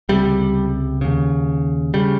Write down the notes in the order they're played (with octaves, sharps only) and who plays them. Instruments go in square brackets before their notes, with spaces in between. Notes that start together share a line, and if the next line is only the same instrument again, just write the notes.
[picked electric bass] C#2 C3 G3
D#2 C#3
C#3 G3